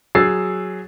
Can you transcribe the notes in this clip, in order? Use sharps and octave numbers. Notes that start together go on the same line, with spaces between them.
F#3 G#4 E6 A6 C7